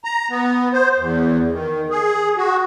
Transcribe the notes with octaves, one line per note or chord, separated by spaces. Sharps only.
A#5
B3
C5
E2
D#3
G#4
F#4